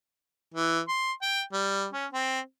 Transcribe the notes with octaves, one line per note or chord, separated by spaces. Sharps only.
E3
C6
G5
G3
C#4
C4